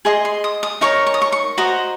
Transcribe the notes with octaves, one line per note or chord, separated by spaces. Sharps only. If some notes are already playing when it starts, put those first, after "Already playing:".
G#4 D#5 C6
C6
D#6
D#6
D#4 A#4 C#5 C#6
C#6
D#6
C#6
C#6
F#4 C5 D#5 A#5